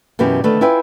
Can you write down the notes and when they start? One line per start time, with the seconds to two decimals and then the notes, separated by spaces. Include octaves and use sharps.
0.19 F#2 B2 E3 B3 G4
0.44 D3 D#3 A3 B4
0.61 E4 F4 B4 E5 G5 G#5